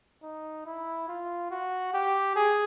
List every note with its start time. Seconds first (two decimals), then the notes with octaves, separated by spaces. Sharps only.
0.23 D#4
0.66 E4
1.08 F4
1.51 F#4
1.94 G4
2.36 G#4